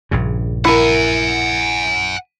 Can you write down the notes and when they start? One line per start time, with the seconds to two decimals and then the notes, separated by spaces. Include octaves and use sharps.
0.11 A#1 G2 C#3
0.65 E4 A#4 F#5 G#5